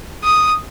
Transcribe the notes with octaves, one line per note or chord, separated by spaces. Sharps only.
D#6